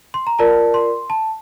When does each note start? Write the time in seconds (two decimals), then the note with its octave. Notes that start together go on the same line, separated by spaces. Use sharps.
0.14 C6
0.27 A#5
0.39 F4 A#4 D5 A5
0.74 C6
1.10 A5